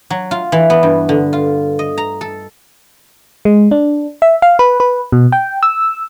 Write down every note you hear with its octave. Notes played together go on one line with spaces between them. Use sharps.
F#3
F4
E3
B3
G2
D3
F4
D#5
A#5
A4
G#3
D4
E5
F5
B4
B4
B2
G5
E6